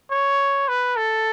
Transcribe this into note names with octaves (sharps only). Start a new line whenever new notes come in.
C#5
B4
A4